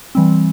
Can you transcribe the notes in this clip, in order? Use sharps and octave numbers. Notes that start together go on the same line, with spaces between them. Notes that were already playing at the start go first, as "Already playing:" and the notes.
E3 G3 C4